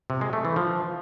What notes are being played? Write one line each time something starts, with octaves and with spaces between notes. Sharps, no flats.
C3
G#3
A3
E3
F3